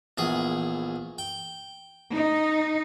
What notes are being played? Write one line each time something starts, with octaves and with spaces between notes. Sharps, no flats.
A#1 E2 G#4
G5
D#4